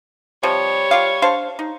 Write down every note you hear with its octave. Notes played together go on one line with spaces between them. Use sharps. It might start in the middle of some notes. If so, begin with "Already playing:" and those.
C3 F3 G3 C#5
F4 G4 F5
D4 C5 F5
D#4